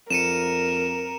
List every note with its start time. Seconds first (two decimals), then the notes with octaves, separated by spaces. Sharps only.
0.10 F2 A#4 C#7 D#7 E7